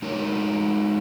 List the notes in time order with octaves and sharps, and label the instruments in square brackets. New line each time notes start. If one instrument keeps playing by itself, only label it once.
[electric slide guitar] G#3 D#4 A#4 C#5